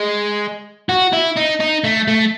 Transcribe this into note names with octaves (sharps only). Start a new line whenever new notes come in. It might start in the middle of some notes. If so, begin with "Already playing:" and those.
Already playing: G#3
F#4
E4
D#4
D#4
A3
A3